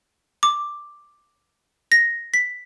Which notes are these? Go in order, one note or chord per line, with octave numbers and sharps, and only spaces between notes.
D6
A#6
B6